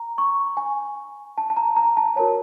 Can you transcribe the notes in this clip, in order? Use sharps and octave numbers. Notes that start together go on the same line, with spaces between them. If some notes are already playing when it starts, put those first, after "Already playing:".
Already playing: A#5
C#6
G#5
A5
A5
A#5
A#5
A5
F#4 A#4 C#5 A5